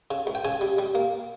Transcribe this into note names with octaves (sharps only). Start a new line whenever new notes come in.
C#3
C#2
G5
C#3 G#5
G3
G3
A#3